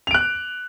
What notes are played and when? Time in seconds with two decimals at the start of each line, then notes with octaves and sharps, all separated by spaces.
0.07 F7
0.11 D7
0.14 F#6